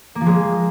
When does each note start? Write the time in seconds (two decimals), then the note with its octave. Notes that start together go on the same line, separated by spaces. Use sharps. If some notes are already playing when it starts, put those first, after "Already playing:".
0.15 A#3
0.21 F3
0.26 G#3